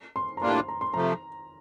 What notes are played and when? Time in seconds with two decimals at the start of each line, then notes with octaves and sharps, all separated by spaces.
0.16 C6
0.37 A#5
0.42 A2 G3 A#3 D4 F4 C6
0.68 A#5
0.81 C6
0.94 C3 F3 A3 A#5